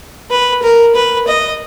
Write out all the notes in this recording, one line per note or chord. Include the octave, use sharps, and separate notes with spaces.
B4
A#4
B4
D#5